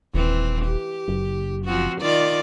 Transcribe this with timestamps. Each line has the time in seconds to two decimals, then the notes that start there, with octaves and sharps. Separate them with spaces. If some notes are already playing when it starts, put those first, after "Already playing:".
0.14 D#1 E3 C4
0.65 G4
1.08 F#1
1.65 F3 C4 F#4
2.01 D#3 F4 D5